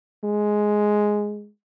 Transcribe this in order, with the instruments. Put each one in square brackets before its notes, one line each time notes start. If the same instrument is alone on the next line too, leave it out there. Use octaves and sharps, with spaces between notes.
[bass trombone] G#3